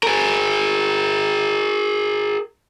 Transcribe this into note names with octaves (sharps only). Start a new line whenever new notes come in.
G#4 A#4